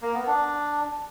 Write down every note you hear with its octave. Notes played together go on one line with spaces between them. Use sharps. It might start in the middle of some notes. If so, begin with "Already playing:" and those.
A#3
B3
D4